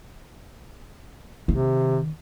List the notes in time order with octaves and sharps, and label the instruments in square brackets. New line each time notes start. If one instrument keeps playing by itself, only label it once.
[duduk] C3 [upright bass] D#3